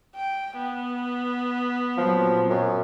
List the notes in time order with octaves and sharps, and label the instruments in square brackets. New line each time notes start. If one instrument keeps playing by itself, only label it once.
[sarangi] G5
B3
[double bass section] A#2 F#3 C4 [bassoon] F3
[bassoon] F#2